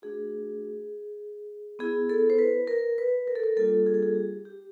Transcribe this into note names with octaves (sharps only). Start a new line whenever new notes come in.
A3 D4 F#4 G#4
B3 E4 G#4
A4
C5
B4
A#4
B4
A#4
A4
A#4
G3 A#3 D4 F4 A4
G#4
A4
G#4
G4
G4